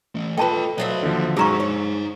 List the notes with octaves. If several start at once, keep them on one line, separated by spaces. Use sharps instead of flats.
E3 A3
F4 A4 B4 D#5 G5 A5 B5
F#3 C5 C#5 D#5 E5
D#2 D3 F3
F#3 G#3 C#4 D#4 G#4 C5 A#5 C#6
C#5